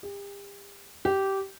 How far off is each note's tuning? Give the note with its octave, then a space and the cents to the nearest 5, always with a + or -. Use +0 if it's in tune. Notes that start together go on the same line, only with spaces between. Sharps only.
G4 +40
G4 -15